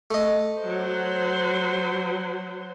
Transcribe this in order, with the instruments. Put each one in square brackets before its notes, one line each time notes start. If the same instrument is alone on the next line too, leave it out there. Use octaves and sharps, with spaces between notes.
[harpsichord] A3 D#5
[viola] F#3 C5